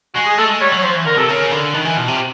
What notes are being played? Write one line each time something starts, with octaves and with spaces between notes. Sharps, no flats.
G#3 F#4
G#4
A3 A4
G#3
G3 C#5
F#3
C#5
F3 C5
E3
D3 A#4
C3 A4
C#3 A#4
D3
D#3 B4
E3
B2 F4
C3
F4